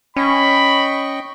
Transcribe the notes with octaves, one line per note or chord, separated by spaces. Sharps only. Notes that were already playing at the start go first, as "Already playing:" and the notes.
C#4 D#5 G5 B5 C#6